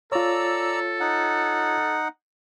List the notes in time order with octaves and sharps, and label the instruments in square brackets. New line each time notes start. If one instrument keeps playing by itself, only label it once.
[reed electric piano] F4 C#5 [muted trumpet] A4 [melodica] D5 A#5 E6
[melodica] D#4 F#5